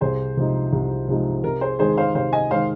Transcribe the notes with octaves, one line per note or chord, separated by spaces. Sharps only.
C2 G#4 C5
C3 F3 G#3 D#4
C2
C3 F3 G#3 D#4
C3 A#4
G#4 C5
D#3 G#3 G#4 C5
C5 F5
C3 C5 F5
D#5 G#5
D#3 G#3 C5 F5